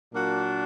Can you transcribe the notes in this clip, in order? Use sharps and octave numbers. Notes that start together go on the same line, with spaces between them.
A#2 F#3 A#3 D4 F#4